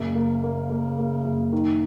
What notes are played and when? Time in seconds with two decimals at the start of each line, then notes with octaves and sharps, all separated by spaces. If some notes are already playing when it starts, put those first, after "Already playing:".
Already playing: F#1 C#3
0.15 A#3
0.44 A#3
0.70 A#3
0.98 A#3
1.25 F#1
1.53 D#3